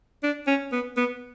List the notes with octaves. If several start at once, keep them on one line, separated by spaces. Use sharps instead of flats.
D4
C#4
B3
B3